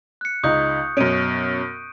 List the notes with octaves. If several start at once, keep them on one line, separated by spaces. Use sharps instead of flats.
F#6 C#7
C#2 D#4 C#6 D#6 G6
F#2 B2 C#4 D7 D#7